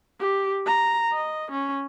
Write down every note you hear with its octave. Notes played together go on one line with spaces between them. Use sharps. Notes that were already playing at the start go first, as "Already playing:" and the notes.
G4
A#5
D#5
C#4